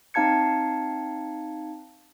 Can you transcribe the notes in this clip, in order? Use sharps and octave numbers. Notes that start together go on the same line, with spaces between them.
C4 D#4 F5 A5 G#6 C#7